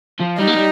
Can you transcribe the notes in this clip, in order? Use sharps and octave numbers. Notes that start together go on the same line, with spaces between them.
F3
G3 D#4
A#3
G3